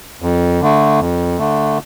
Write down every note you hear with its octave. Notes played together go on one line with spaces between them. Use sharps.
F2
D3 A3
F2
D3 A3